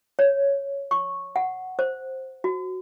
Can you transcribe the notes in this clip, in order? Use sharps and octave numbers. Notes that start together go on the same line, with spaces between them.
C#5
C#6
F#5
C5
F#4